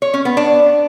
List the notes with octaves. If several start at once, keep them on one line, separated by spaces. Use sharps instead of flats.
C#5
C#4
B3
D4